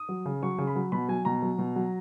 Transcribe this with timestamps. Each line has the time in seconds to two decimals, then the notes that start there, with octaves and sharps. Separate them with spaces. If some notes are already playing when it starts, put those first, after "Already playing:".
Already playing: D#6
0.09 F#3
0.25 C#3
0.43 F#3 C#6
0.58 C#3
0.67 B5
0.75 F#3
0.92 B2 B5
1.08 F#3 G#5
1.25 B2 A#5
1.42 F#3
1.58 B2
1.76 F#3